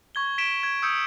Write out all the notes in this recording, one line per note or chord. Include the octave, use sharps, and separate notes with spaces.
C#6 G#6 G7
B6 D7 E7 G7
G#6
D#6 E6 G6 C#7